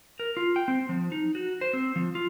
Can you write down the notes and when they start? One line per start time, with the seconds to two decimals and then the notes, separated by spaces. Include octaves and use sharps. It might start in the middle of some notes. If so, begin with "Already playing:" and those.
0.20 A#4
0.37 F4
0.56 G5
0.68 C4
0.89 F3
1.12 D#4
1.35 F#4
1.61 C5
1.73 C4
1.96 F3
2.15 F4